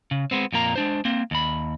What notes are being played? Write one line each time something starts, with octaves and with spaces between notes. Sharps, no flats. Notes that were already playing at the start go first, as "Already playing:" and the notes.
C#3
G#3 B3 C4
F2 A#2 A#3 A#5
G#3 D4 C5
A#3 C4
D#2 B5